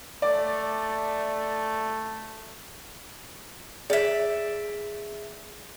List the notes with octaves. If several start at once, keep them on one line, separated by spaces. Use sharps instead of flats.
A3 D5
G#4 D5 E5